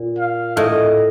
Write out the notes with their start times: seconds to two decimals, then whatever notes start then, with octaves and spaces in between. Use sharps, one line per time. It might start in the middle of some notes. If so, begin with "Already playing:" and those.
Already playing: A#2
0.19 F5
0.57 A2 D#5